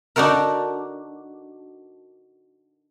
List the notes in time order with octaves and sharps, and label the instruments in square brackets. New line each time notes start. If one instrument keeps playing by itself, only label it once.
[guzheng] D4 D#4 F#4 A4 A#4